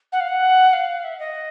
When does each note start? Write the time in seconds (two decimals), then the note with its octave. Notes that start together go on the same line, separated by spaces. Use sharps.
0.12 F#5
0.20 F5
0.28 F#5
0.73 F5
1.04 E5
1.19 D#5